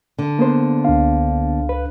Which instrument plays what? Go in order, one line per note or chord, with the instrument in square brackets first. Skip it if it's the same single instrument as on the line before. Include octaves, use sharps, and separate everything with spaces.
[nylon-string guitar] D3
[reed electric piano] A#3 B3 C5
[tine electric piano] C#2 D4 F5
[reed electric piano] B4